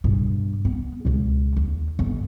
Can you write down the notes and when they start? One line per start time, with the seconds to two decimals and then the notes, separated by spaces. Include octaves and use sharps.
0.04 G2 B2
0.65 B3
1.05 C#2 B2
1.57 D#2
1.99 G1